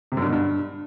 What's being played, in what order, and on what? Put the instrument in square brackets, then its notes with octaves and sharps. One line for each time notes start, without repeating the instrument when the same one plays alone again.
[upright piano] C3
F#2
G2
B2
G2